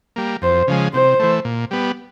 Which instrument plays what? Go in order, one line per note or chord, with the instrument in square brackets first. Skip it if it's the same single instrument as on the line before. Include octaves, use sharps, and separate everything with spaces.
[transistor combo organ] G3 A#3
[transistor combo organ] F2 [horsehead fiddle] C5
[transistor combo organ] C#3 F3 G#3
[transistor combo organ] C3 [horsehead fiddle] C5
[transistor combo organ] E3 A3
A#2
G3 B3